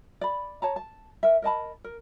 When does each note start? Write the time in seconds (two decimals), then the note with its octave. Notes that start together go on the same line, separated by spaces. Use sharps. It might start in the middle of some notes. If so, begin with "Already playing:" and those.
0.21 D5 B5
0.62 C#5 A5 A#5
0.76 A5
1.23 A#4 E5
1.42 A#4 D#5 A5 B5
1.84 A#4